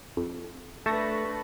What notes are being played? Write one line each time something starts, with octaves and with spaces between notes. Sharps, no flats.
F2
A3 D4 B4 A5 C#6 A#6